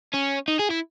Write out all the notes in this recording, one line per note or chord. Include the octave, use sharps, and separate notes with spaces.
C#4
D#4
G#4
E4